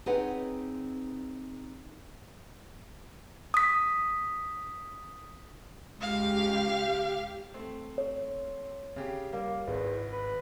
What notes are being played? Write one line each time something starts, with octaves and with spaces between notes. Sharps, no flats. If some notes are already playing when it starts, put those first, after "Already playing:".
C4 D#4 G#4 B4 C#5 F#5
D#6 B6
C#2 G4 F5
A3 C4
C#5
C#3 G4
G3 A#3
G#1 E2
B4